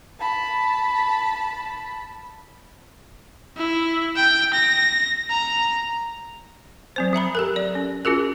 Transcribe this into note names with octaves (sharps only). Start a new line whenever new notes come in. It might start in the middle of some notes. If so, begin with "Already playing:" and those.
A5 B5
E4
G5
A#6
A#5
F#3 C4 C5
F#3 E5 A#5 B5
G4 A4 A#4
D5
C#4
C#4 F4 F#4 G#4 A#4